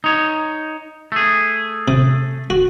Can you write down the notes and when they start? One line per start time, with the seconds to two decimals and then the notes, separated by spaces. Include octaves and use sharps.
0.04 D#4 C#5
1.12 A3 G#4
1.88 C3
2.50 F#4